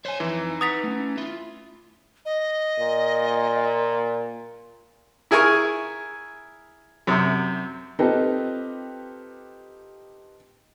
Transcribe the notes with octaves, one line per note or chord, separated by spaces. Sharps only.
C5 C#5 G#5 C6
F2 E3 D#4 E4
B4 F#5 A#5 D#6 A6 B6
A3 C#4
E4 F4
D#5
A#2
E4 G#4 A#4 G#5 C#6
F#2 C3
C4 D#4 F4 G4 A4 B4